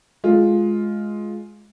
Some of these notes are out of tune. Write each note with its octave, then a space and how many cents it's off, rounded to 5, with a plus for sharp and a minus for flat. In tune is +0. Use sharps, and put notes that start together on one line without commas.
G#3 +15 F4 +0